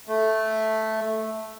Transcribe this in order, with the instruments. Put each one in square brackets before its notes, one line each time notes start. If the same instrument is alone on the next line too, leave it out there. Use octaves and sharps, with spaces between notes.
[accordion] A3